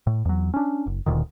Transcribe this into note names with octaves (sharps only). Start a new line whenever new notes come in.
A2
E2 F#3
C#4 D4
F#1
D1 D2 A#2 D#3